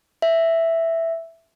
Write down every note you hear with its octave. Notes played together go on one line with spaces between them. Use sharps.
E5